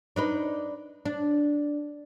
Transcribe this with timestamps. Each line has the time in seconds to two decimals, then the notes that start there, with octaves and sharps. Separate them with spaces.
0.16 D4 D#4 B4
1.05 D4